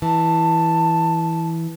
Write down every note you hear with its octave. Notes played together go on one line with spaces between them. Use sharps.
E3 A5